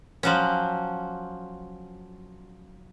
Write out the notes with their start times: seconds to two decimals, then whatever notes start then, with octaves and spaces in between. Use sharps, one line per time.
0.23 F3 F#3 C#4